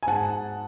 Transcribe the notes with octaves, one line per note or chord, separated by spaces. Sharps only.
G#5
G#2 F#5 A5